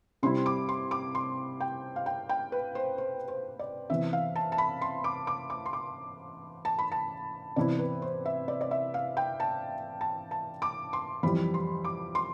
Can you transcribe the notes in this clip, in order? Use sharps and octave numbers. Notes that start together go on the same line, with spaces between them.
C3 G3 C4 E4 C6
D6
C6
D6
C6
G5
F5
G5
G5
B4
C5
C5
C5
D5
C3 E3 B3 E5
F5
A5
A5
B5
C6
D6
D6
D6
C6
D6
A5
B5
A5
C3 E3 B3 E4 D5
B4
C5
E5
D5
D5
E5
F5
G5
A5
A5
A5
D6
C6
F2 E3 G3 B5
C6
D6
C6